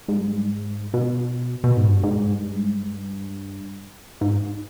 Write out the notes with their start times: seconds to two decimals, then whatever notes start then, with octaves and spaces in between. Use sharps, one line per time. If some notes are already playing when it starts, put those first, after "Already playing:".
0.08 G#2
0.19 G2
0.25 G#2
0.94 B2
1.64 B2
1.77 G#2
1.89 G2
2.03 G#2
2.33 G2
2.55 G#2
2.77 G2
4.21 G#2